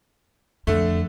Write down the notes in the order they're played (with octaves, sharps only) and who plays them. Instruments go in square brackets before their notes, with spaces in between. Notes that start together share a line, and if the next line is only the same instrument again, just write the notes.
[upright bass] F2 [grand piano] D3 A3